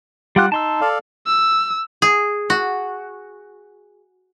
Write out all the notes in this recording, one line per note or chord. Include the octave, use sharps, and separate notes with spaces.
G3 F4 G4 F#5 F#6
D#4 A5 C6 E6
A4 D5 F5
E6
G#4
F#4